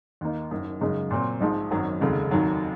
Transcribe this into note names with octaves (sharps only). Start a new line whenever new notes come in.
D#2 D#3 A#3 D#4
F#1 F#2 D#3
F#2 C#3 G#3 D#4
A#2 F#3 C4
A#1 G#2 F3 G#3 D#4
G#1 F#2 D#3 F#3
F1 D#2 C#3 G#3
F1 D#2 D#3 F#3